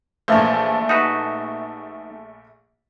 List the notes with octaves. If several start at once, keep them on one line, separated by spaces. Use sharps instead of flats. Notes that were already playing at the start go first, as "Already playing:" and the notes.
A#1 E3 F3 A3
D#4 F#4 B4